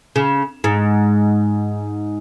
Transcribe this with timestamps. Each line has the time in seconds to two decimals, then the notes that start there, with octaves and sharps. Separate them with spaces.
0.16 C#3
0.64 G#2